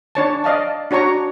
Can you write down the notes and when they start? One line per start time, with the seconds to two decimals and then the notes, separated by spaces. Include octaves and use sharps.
0.15 D4 C#5 A5
0.44 D5 D#5 F5 A5
0.91 D4 F#4 C#5 A#5 C#6